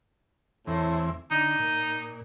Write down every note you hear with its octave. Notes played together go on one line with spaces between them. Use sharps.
E2 A2 E3 C4
D3 D#4
A#2